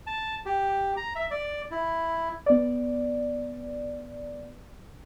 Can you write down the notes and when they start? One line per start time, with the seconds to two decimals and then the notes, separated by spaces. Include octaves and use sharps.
0.07 A5
0.46 G4
0.97 A#5
1.16 E5
1.31 D5
1.71 E4
2.46 B3 D5